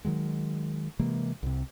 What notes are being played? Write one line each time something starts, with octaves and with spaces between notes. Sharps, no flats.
D#3 F#3 G#3
C3 E3 G#3 A#3
C2 C3